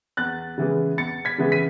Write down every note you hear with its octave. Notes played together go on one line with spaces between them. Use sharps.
E2 F#6 A6
C#3 E3 G#3 B3
E2 A6 C#7
G#6 B6
C#3 E3 G#3 B3
B6 D#7